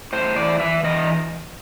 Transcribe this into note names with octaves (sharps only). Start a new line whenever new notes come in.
A2 C5
E3 D5
E3 E5
E3 D#5